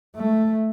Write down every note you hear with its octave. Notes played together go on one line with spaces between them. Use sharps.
A3